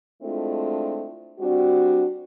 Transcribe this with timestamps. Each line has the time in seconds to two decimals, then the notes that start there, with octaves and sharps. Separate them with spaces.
0.22 G#3 A3 C4 D4 E4 F4
1.39 G3 C4 D4 F#4